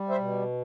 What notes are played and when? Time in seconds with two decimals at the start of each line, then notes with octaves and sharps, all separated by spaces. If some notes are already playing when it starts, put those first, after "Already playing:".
Already playing: G3
0.09 C5 E5
0.18 B2